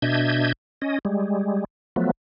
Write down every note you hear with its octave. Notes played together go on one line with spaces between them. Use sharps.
B2 D4 D#5 E5 G6 G#6
C#4 D#5
G3 G#3
F3 F#3 A3 B3